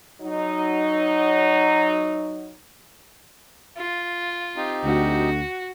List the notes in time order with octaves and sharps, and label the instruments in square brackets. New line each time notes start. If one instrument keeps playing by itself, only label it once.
[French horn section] F#3 D#4
[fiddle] F4
[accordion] C4 D#4 G4
[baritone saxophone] D2 [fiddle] F#4